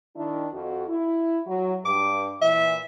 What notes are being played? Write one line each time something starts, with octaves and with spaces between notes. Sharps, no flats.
D#3 D4 E4
F2 F#4
E4
F#3
G2 D6
A#2 E3 E5